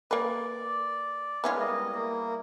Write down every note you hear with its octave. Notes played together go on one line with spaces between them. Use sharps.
A#3 B4 D5
G#3 A#3 B3 C#4 E4 F4
G3 D#5
A#3